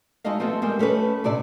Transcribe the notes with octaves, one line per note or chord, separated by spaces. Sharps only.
G#3 A3 D#4 F#4 D#5 F5
F3 A3 B3 C4 F4
G3 G#3 C4 A#4
A3 C#4 A4 B4
A2 C3 D4 D5